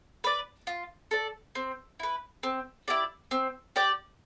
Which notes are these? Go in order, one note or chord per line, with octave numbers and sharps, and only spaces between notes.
B4 D5
F4
A4 D5
C4
E4 B4
C4
E4 G4 D5
C4
G4 D5 G5